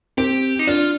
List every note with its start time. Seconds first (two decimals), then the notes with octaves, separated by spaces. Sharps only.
0.18 C4 G4
0.59 D#4
0.67 D4 F4